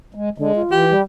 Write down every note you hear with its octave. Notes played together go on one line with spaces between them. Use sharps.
G#3
D3 G#3
F4
E3 G4
G3